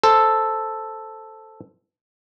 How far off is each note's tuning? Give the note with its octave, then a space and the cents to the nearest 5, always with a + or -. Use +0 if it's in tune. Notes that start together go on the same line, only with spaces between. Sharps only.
A4 +0 C5 +0